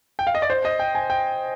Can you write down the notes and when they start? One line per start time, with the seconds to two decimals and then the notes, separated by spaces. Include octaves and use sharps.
0.19 G5
0.27 F5
0.35 D#5
0.42 D5
0.50 C5
0.65 D#5
0.79 G5
0.95 G#5
1.10 G5